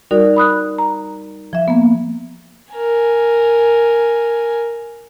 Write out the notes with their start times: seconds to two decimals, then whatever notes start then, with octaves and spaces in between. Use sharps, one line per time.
0.11 G3 D#4 F#4 A#4 D5
0.37 B5 D#6 F#6
0.78 A#5
1.53 F3 E5
1.68 A#3 B3
2.73 A#4 G#5